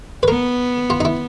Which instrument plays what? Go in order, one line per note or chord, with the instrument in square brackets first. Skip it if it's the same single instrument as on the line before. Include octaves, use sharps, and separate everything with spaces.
[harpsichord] B4
[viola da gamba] B3 [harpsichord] A#4
[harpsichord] F4
D#4
E4